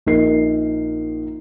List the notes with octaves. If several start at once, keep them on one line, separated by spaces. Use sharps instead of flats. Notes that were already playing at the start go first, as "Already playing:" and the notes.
A#1 D#4 A#4 C7